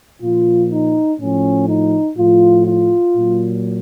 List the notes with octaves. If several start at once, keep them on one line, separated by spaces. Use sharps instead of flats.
A#2 F3 F4
D#4
A2 F3 C#4
D#4
A2 F3 F4
F4
A#2 F#3